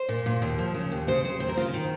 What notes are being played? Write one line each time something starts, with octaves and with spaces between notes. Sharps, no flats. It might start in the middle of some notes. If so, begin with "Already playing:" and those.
Already playing: C5
A#2
A#2
D#2
F3
C#3
D#2
C#3 C5
C#3 C5
D#2 C5
A#4
C#3 F4
D#3